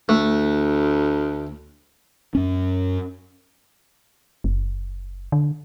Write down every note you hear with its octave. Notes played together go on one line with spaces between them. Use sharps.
D2 A3
F#2 C#4
F#1
D3